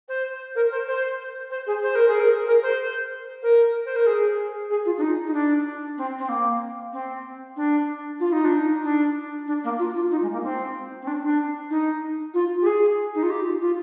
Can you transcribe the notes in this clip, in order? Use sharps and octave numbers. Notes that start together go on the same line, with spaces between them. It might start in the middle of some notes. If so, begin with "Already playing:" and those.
C5
A#4
C5
C5
C5
G#4
C5
A#4
G#4
A#4
A#4
C5
A#4
C5
A#4
G#4
G#4
F4
D4
D#4
D#4
D4
C4
C4
A#3
C4
D4
F4
D#4
D4
D#4
D4
D4
A#3
F4
F4
D#4
G#3
A#3
C4
C4
D4
D4
D#4
F4
G4
G#4
D#4
F4
G4
F4